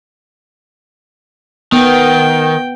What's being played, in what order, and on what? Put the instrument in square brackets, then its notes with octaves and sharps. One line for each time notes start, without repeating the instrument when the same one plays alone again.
[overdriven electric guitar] D#3 [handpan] B3 [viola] G5